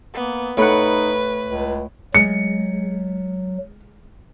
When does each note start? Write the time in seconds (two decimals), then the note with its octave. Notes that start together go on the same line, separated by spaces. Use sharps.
0.14 A#3 B3
0.57 A2 D#4 B4 F#5
1.44 C#2
2.15 F#3 G#3 C#7